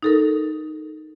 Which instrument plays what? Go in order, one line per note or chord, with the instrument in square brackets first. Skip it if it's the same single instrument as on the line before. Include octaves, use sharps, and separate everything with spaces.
[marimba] D#4 A4 A#4